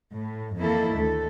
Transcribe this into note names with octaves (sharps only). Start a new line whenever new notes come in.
A2
F2 D#3 E3 A#3 E4 A4
D2 A3 A4